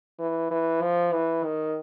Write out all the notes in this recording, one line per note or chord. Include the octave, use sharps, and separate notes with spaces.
E3
E3
F3
E3
D#3